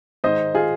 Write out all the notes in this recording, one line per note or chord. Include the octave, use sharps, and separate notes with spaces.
G#2 D#3 C5 D#5
F4 G#4